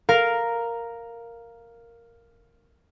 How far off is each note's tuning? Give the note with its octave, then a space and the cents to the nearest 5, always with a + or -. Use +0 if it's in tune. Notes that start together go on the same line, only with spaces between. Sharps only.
A#4 +0 F5 +0